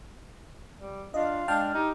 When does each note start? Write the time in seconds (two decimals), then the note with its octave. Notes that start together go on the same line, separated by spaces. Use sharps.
0.77 G3
1.14 D4 F4 D#5 F5
1.48 G#3 D4 G5 A5 F6
1.74 D#4 G4